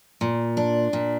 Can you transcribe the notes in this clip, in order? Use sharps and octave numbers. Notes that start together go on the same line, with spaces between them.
A#2
D4
A#2